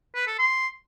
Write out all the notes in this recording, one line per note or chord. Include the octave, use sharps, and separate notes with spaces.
B4
A4
C6